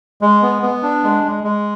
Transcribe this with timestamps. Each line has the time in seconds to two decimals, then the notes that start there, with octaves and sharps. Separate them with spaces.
0.21 G#3
0.42 B3
0.62 B3
0.83 D4
1.04 G#3
1.24 G#3
1.44 G#3